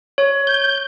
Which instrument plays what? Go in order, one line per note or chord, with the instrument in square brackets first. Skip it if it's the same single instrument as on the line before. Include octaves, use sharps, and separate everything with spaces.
[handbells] C#5
[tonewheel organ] G6